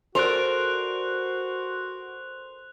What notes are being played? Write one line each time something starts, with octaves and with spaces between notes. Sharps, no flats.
F#4 A4 A#4 C5 D5 F#6 F7